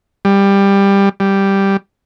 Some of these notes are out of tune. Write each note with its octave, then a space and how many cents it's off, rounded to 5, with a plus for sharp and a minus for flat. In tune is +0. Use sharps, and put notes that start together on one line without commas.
G3 +15
G3 +0